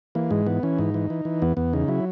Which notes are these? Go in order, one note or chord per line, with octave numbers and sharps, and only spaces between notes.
E3 A#3
G#2 G#3
E3 B3
E3 C#4
G#2 D#4
E3
E3
E3
E2 B3
E2 B3
C#3 D#4
F#3 E4